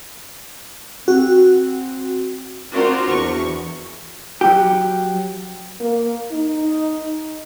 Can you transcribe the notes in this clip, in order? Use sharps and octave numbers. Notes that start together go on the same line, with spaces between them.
C4 F#4
C4 D4 F4 F#4 A#4 C5
E2 C#6
F#3 G4
A#3
D#4